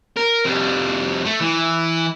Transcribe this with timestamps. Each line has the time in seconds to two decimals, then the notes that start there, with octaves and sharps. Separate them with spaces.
0.16 A#4
0.45 F2 G3
1.25 A3
1.40 E3